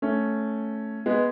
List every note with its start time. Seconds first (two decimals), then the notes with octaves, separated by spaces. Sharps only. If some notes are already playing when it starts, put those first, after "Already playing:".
0.02 A3 C#4
1.06 G#3 B3